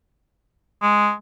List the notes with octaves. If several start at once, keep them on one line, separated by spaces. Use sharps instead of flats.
G#3